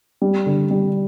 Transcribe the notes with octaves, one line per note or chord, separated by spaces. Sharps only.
G3
D3
G3